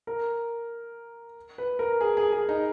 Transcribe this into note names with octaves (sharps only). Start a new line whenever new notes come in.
A#4
B4
A#4
G#4
G#4
G#4
D#4